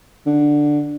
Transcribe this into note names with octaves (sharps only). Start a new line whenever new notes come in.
D3